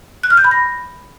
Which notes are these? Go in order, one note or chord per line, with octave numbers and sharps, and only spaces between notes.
F#6
F6
G6
B5
A#6